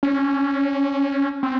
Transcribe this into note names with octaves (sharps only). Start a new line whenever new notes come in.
C#4
C4